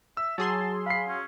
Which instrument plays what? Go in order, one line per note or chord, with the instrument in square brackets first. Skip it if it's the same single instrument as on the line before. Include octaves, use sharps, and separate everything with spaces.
[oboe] E5 [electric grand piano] E6
[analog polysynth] F#3 G#4 C6 [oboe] A5
[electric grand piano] F5 C7 [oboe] B5
[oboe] C#4